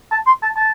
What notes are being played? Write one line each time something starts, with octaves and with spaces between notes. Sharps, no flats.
A5
C6
A5
A5